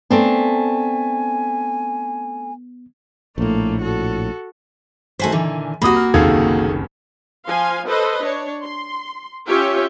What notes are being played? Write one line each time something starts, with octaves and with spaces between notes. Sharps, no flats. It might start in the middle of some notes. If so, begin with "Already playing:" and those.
A3 B3 C4 D4 G#5
A#1 A2 A3 A#3
F#4 A4
D#3 A3 F#4 C5 G#5 B6
A#2 D3 E3
C2 G3 A#3 F#4 B5 D#6
F6
F#1 C2 D#3 G#4 A4 F5 G#6
F3 F5 G#5 C6
A4 B4 C5 D#5
D4 C#5
C6
C#4 F4 G4 C#5 E5 G5